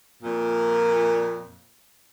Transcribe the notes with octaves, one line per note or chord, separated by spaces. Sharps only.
F2 A#2